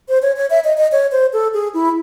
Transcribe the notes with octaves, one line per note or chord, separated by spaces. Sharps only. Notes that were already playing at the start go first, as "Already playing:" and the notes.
C5
C#5
C#5
E5
D#5
D#5
C#5
C5
A4
G#4
E4